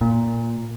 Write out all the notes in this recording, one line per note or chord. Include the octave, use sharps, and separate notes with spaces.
A#2